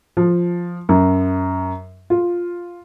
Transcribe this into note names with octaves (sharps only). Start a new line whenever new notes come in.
F3
F#2
F4